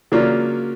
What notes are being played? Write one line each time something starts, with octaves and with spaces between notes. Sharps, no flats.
C#3 F#3 A#3 D4 F4